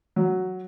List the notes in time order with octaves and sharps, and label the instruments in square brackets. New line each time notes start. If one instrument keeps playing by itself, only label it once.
[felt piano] F#3